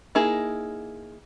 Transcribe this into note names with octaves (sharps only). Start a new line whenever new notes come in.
A#3 D#4 E4 G#4